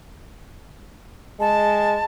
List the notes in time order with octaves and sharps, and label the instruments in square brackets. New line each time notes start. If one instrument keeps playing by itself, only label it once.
[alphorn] G#3 [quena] A5